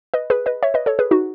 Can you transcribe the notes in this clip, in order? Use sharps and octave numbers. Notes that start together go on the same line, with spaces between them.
B4 D#5
G#4 B4
B4 D#5
C#5 E5
B4 D#5
A4 C#5
G#4 B4
D#4 F#4